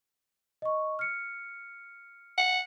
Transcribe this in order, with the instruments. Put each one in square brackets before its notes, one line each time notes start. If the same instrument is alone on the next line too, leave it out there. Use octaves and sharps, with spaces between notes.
[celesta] D#5 C#6
F6 C#7
[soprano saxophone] F#5